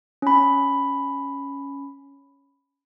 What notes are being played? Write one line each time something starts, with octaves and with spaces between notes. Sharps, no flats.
C#4 B5